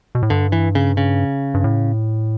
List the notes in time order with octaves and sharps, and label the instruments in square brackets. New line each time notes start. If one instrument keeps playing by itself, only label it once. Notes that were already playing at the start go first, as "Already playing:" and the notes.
[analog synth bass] B2
A2
[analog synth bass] G2 [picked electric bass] D3
[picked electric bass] E3
C#3
C#3
[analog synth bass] G2
A2